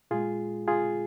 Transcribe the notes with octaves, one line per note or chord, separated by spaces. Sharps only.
A#2 G#3 F4 G#4
F4 G#4